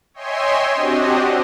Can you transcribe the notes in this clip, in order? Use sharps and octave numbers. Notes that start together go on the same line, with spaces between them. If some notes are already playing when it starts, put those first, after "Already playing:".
C#5 D#5 E5 G5 G#5 C6
C4 D4 F#4 G4 D#5